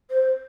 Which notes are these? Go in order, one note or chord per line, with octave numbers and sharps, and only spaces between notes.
C5